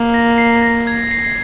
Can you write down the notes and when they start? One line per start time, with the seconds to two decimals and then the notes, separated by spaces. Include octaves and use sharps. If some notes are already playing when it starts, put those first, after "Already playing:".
Already playing: A#3
0.14 A#6
0.38 C7
0.62 A#6
0.87 G#6
1.11 C7
1.25 C7